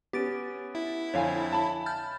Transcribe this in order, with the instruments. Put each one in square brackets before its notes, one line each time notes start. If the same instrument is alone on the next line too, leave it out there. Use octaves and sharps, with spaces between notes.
[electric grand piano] B3 C#4 [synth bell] G4 A6 D7
[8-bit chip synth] E4
[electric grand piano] F2 D3 [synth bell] C#5 F5 G#5
[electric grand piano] A5 B5
[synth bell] F6 G6 A6